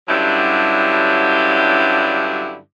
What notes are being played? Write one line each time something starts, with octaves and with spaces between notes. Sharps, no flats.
G2 D3 F#3 G3 C#4 E4